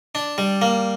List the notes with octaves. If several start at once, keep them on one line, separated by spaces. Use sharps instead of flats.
D4
G3
A#3